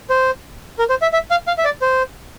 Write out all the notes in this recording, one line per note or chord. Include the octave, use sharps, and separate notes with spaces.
C5
A#4
C5
E5
E5
F5
F5
E5
D5
C5